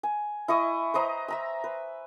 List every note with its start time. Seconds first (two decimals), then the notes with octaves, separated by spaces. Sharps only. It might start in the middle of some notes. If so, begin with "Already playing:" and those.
0.03 G#5
0.48 E4 D#5 C#6 D#6
0.94 B4 C5 D#5 A#5
1.28 E5 A#5 E6
1.64 B4